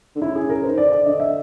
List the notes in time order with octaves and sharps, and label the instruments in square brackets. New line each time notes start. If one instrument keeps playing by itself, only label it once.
[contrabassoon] D3
[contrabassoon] C#3 [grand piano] E4
[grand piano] G#4
A#4
[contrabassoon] D#3 [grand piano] C5
[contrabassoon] D3 [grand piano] D5
[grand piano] D5
[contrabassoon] D3 [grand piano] D#5
[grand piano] E5